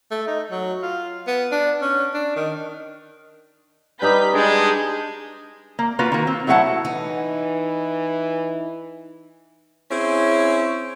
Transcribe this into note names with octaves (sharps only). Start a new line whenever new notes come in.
A3
D#4
F#3
F4
B3
D4
C#4
D4
D#3
G3 D#4 B4 A#5 G6 B6
G#3 D4 G6
A#3
A#3 F4 F#4 B4
D#3 A#3
C4
F#3 A3 E4 G4 F#5 A5
E3 D#4
C4 C#4 E4 G#4